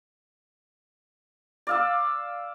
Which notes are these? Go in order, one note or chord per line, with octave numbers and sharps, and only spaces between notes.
D5 F5 E6